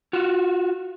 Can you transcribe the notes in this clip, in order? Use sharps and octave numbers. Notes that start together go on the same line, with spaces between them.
F4 F#4